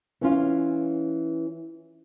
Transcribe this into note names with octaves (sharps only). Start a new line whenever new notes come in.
E3 C#4 F4